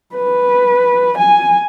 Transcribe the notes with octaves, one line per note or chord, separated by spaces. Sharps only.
B4
G#5